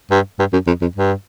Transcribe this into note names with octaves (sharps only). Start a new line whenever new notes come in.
G2
G2
F#2
F2
F2
G2